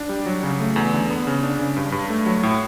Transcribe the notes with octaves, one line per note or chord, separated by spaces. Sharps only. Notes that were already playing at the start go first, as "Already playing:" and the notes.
Already playing: D4
G3
F#3
C#3
A3
E2
D3
B3
C#3
D4
C#3
G2
G2
A3
F#3
A2